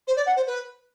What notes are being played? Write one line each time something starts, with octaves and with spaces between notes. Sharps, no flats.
C5
D5
F#5
C5
B4